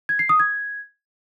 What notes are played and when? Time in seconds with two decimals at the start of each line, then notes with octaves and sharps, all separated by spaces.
0.09 G#6
0.19 C7
0.29 D#6
0.40 G#6